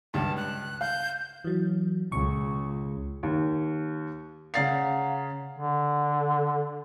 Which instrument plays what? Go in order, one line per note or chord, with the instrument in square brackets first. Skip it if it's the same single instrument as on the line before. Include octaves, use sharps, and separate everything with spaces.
[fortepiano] C#2 G2 [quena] A5
[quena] F#6
[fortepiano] F5 [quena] G6
[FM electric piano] E3 F#3
[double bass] C#2 [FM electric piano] C#6
[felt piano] D#2
[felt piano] C#3 A6 C7 [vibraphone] F5 F#5 A#5
[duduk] D3